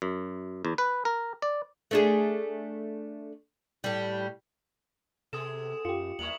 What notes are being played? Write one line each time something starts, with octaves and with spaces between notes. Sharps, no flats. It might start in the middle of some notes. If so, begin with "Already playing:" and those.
F#2
E2
B4
A#4
D5
A3 D4 G#4
A2 G3
C3 B3 G#4 A4 D#6 E7
F#2 F4 G4 C#7
D#2 G3 A#3 E4 C#6 F7 F#7